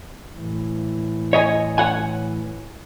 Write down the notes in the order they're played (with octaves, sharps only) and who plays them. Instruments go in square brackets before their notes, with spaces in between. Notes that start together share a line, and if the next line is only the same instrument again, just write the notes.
[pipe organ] A2 E3
[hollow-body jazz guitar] C#5 D#5 G#5
C#5 F#5 G#5